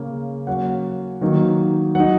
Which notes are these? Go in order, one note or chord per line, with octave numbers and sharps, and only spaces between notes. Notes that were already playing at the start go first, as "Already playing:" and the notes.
Already playing: C#3 A#3 C#4
F#3 A#3 C#4 F#5
D#3 F#3 A#3 D#4
F#3 D#4 F#5